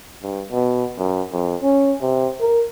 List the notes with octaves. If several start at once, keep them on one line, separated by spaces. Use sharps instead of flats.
G2
B2
F#2
F2
C#4
C3
A#4